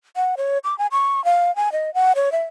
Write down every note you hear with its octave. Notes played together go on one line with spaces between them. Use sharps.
F#5
C#5
D6
G#5
C#6
F5
G#5
D#5
F#5
C#5
E5